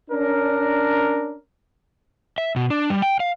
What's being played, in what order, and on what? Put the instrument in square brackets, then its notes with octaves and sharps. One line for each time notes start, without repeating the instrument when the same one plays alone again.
[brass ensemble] C#4 D4 A#4
[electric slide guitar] E5
B2
D4
G3
G5
F5